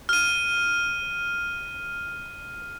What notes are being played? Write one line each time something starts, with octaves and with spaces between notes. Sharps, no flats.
F6 D#7